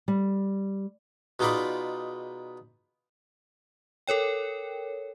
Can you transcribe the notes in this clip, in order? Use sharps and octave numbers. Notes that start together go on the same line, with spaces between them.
G3
B2 G#3 D#4 F4 D5 B5
A4 A#4 C#5 G5